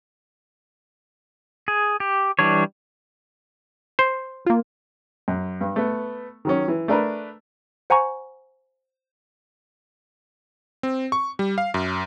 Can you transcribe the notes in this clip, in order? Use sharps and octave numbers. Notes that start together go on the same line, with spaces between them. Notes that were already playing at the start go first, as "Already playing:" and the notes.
G#4
G4
E3 G3 D4 C#5
C5
A#3 F4
F#2
G2
A3 B3
D#3 F#3 C#4
E3
A3 D4 A#4 B4
C5 F#5 G#5 A#5 C#6
C4
C#6
G3
F5
F#2